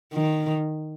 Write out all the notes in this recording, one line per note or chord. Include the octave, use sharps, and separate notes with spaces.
D#3